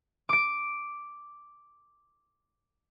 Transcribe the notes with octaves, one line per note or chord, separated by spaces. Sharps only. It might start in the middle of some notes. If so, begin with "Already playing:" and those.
D6 D7